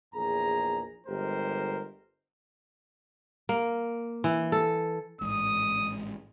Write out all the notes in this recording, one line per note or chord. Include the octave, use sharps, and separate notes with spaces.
A#1 E2 G#4 A#5
G1 G#3 G4 A#4 C5
A#3
E3
A4
A1 G#2 D#6